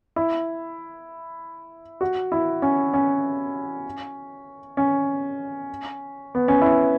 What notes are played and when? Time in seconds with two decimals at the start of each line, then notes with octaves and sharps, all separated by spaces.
0.16 E4
2.01 F#4
2.32 E4
2.62 C#4
2.94 C#4
4.77 C#4
6.35 B3
6.48 C#4
6.62 E4